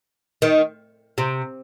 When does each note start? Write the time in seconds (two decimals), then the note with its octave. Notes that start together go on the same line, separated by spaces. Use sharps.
0.42 D#3
1.18 C3